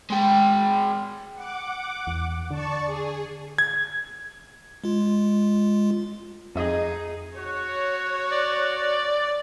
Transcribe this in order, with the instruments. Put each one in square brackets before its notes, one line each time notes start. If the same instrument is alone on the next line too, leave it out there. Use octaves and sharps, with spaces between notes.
[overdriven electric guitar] G#3 G5
[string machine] F#5 D6
[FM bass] E2
[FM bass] D3 [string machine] D5 A5 C#6
[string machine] G#4
[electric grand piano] G#6
[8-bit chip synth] G#3 F4
[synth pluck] F2 D#5 [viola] D#4 G#4
[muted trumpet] F#4 [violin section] C#5
[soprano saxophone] D5